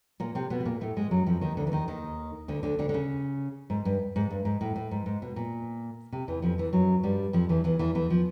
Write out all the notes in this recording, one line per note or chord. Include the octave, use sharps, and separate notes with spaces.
A#2 A#3
C3 C4
B2 B3
B3
A#2 A#3
A2 A3
G#2 G#3
F#2 F#3
F2 F3
D#2 D#3
D2 D3
E3
D#2 D#3
D#2 D#3
D2 D3
D2 D3
D2 D3
D3
C#3
G#2
G2
G#2
G2
G#2
A2
A2
G#2
G#2
B2
A#2
C3
E2 E3
F2 F3
E2 E3
F#2 F#3
G2 G3
F2 F3
E2 E3
E2 E3
E2 E3
E2 E3
F3